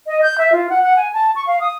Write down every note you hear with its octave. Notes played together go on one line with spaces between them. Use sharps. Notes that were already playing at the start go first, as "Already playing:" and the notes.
D#5
G6
E5
F4
F#5
F#5
G#5
A5
C#6
F5
D#6